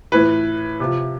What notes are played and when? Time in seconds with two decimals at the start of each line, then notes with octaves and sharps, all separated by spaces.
0.12 A2 E3 B4
0.80 C3 F3